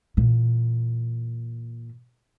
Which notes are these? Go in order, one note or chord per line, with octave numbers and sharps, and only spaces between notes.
A#2 E3